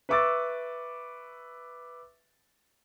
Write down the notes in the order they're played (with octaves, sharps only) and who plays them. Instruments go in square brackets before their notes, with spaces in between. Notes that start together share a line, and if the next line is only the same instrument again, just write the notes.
[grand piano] B4 E5 C#6 D6 E6 A6